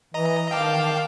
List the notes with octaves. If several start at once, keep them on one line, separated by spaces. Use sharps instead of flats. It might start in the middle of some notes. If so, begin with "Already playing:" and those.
E3 D#5 A#5
D#3 F5 G5 A5 D6